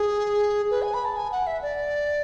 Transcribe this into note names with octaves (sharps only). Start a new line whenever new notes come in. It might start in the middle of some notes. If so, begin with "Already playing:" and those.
Already playing: G#4
B4
G#5
B5
A5
G#5
F#5
E5
D5